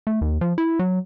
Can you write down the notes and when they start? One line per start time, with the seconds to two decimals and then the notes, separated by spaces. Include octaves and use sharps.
0.07 A3
0.21 D#2
0.41 F3
0.58 E4
0.79 F#3